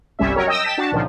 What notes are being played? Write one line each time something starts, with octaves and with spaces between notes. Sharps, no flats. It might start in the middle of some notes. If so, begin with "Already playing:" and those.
G1 C2 G3 C#4 E5
F#3 C#4 A#4 C#5
D#5 G5 D#6 E6 A#6
G5 A5 B6 E7
D4 F#4 A5
C#2 A#2 D#3 F3